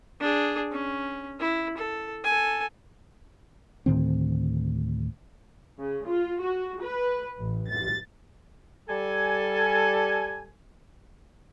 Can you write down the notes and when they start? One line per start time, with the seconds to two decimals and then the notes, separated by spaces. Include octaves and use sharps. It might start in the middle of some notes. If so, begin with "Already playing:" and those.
0.20 D4 G#4
0.72 C#4
1.40 E4
1.78 A4
2.24 A4 G#5
3.86 D2 A2 D#3 C4
5.80 C#3
6.08 F4
6.42 F#4
6.83 B4
7.39 A1
7.69 A6
8.89 G3 A4 G#5